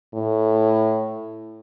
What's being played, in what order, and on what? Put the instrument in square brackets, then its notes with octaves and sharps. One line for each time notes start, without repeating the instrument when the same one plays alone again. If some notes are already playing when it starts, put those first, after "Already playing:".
[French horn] A2